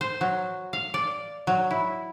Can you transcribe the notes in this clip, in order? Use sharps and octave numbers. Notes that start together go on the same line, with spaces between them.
C5
F#3
F5
D5
F#3
E4